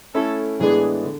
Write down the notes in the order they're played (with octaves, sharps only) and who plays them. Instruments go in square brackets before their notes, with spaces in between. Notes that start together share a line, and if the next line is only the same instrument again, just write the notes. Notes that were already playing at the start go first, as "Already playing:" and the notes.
[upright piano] A3 C#4 E4 [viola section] A4
[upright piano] A2 E3 G#3 B3 D4 [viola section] G#4
[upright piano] D3